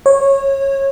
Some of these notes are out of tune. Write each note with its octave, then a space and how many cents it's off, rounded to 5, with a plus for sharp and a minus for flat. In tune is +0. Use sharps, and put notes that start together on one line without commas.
C#5 -20